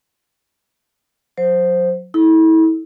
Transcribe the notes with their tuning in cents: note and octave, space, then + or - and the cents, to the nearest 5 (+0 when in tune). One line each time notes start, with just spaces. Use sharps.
F#3 -25 C5 +0
E4 -35 A4 -35